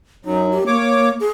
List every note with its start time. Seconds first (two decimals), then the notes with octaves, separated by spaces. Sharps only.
0.25 F#2 F#3 D#4
0.52 G4
0.67 A#3 C#5 D6
1.20 G#4